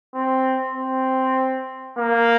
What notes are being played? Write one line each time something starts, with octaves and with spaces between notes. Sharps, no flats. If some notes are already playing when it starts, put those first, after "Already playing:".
C4
C4
A#3